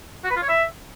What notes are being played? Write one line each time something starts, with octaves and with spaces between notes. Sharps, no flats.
F#4
B4
F4
C#5
E5